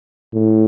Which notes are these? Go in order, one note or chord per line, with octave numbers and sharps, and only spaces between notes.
A2